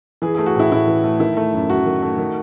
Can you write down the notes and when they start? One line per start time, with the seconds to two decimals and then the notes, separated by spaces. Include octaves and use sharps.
0.22 E3 G#4
0.35 A3 G#4
0.46 F#4
0.55 A2 E4
0.71 A2 E4
0.87 E3
1.04 A3
1.20 D#3 E4
1.37 A3
1.54 F#2
1.69 F#2 F#4
1.85 D#3
2.02 A3
2.18 D#3